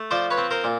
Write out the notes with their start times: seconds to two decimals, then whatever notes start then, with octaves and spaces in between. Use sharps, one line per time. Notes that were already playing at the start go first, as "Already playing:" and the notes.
Already playing: A3
0.11 F3 C5 D5
0.31 B4 C#5
0.38 C4
0.51 A#4 C5
0.64 A#2